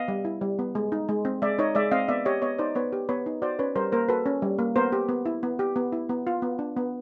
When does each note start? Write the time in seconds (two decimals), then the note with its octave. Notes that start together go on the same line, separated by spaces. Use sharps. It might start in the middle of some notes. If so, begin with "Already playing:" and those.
Already playing: B3 D#5 F5
0.08 G3
0.25 E4
0.41 G3
0.59 B3
0.75 G#3
0.92 D#4
1.09 G#3
1.25 C4
1.42 G#3 D5 E5
1.59 D#4 C#5 D#5
1.75 G#3 D5 E5
1.91 C4 D#5 F5
2.08 B3 D5 E5
2.25 G4 C#5 D#5
2.42 B3 C#5 D#5
2.59 D#4 C5 D5
2.75 B3 B4 C#5
2.93 G4
3.09 B3 B4 C#5
3.26 D#4
3.42 F#4 C5 D5
3.59 C#4 B4 C#5
3.76 G3 A#4 C5
3.92 A#3 A#4 C5
4.08 F#4 A4 B4
4.26 C#4
4.42 G3
4.59 A#3
4.76 B3 A#4 C5
4.92 G4
5.09 B3
5.26 E4
5.43 B3
5.59 G4
5.76 B3
5.92 E4
6.09 B3
6.27 F4
6.42 B3
6.59 D4
6.77 B3